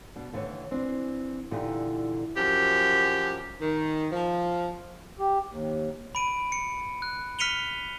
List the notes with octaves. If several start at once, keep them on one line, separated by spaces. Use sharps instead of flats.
B2 D4
D#2 D3 E3 A3 C#5
E3 C4 D4
A#2 D3 E3 D#4 G4
F#2 F3 G4
D#3
F3
G4
D#2
B5 D7 D#7
C#7
F#6
F6 B6 C#7 D#7 F7 G7